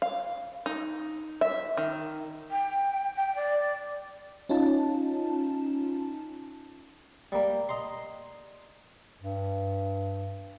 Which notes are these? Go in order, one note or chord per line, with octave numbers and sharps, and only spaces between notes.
F5
D#4
E5
D#3
G5
G5
D5
C#4 D#4 F4 A5
G3 A#3
D#5 A#5 C6
G2